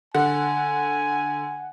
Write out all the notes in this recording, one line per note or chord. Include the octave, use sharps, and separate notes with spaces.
D3 F#5 G#5